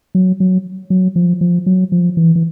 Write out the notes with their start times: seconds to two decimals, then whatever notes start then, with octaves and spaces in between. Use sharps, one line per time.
0.15 F#3
0.40 F#3
0.90 F#3
1.16 F3
1.41 F3
1.66 F#3
1.92 F3
2.17 E3
2.36 E3